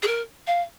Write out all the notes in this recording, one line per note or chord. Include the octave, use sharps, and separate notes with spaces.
G#4
A#4
F5